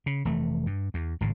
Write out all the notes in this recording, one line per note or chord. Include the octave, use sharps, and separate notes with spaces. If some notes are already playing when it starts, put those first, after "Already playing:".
C#3
F1 E3 A3
G2
E2
G#1 A2 C#3